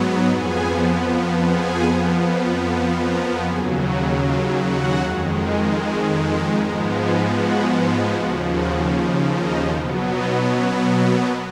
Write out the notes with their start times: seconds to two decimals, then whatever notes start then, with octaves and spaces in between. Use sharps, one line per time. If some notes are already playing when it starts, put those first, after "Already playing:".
Already playing: G#2 F#3 B3
0.30 F2 F3 B3 G#4 G#5
1.49 G#4 G#5
1.88 F2 F3 B3
3.05 A#4 A#5
3.45 D#2 C#3 F#3 G#4 G#5
3.84 F#4 F#5
4.23 F4 F5
4.62 F#4 F#5
5.01 F2 D#3 G#3
5.80 G#4 G#5
6.58 G#2 F3 G#3 B3 A#4 A#5
6.97 G#4 G#5
7.37 F#4 F#5
8.15 D#2 C#3 F3 F#4 F#5
8.55 F#4 F#5
9.33 D#4 D#5
9.73 B2 F#3 B3
10.11 D#4 D#5
10.51 C#4 C#5
10.90 A#3 A#4